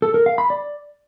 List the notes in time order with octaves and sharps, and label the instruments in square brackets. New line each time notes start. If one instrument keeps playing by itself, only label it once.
[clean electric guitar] A4
A#4
F5
B5
D5